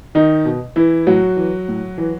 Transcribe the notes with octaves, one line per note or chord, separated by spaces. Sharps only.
D#3 D#4
B2
E3 E4
A2 F#3 F#4
E3
A2
E3